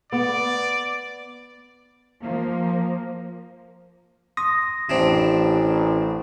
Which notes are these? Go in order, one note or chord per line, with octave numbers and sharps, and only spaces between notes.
B3 D5
F3 A#3
C6 D#6 A#6
A1 C4 D4 E4